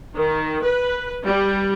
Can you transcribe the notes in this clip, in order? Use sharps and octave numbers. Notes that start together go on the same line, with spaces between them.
D#3
B4
G3